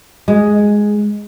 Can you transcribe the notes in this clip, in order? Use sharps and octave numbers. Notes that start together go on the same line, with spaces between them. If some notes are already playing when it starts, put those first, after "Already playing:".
G#3